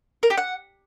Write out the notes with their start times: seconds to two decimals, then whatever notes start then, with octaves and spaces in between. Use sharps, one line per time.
0.23 A#4
0.30 G4
0.37 F#5